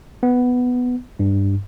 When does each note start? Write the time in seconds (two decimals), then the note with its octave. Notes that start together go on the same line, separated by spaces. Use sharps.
0.23 B3
1.19 G2